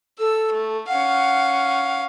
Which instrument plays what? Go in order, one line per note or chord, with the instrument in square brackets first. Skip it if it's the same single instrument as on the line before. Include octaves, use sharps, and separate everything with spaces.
[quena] A4 [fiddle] E6
[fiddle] A3
[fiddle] C#4 F5 [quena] F#5